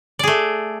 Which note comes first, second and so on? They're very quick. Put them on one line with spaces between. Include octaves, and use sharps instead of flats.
D5 G#4 A3